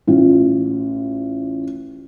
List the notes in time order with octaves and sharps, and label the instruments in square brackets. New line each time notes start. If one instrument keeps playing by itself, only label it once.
[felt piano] A1 F4